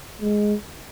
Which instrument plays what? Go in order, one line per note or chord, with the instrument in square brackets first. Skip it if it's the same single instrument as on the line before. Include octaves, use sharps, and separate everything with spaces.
[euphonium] G#3